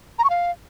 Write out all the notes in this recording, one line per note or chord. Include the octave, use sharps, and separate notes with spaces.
A#5
C#6
F5